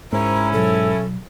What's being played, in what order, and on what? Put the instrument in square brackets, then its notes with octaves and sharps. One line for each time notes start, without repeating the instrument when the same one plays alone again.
[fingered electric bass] G#2 [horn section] C#4 E4 [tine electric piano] A#4 C5 [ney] A#5
[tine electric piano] B2 F#3 [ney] A4